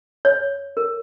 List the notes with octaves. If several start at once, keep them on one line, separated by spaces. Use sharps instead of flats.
C#5
A#4